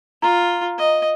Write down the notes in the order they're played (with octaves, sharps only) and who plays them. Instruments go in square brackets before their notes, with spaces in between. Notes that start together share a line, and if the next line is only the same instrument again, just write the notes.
[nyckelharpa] F4 [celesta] A#5
[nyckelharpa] D#5